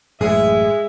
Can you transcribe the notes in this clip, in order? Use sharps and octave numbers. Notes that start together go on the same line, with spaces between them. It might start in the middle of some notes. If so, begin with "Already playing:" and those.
A1 F#2 A2 G#3 G#4 E5